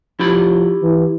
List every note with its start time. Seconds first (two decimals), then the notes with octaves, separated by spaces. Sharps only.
0.20 F3 E4 G4 B5
0.82 E3